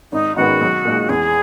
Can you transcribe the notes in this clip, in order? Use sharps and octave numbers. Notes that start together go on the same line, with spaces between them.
G#1 D#4
G#2 D#3 G#3 B3 F#4
B1
A#2 G#3 D#4
E2 G#4